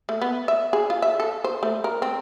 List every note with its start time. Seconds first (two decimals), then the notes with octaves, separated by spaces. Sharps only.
0.09 A3
0.22 B3
0.48 E5
0.73 G#4
0.90 F4
1.02 E5
1.20 A4
1.44 C5
1.63 A3
1.84 A#4
2.02 C4